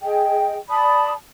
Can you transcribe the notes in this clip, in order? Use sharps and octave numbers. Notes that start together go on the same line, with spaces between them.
G#4 D#5 G5
D5 A5 B5 D#6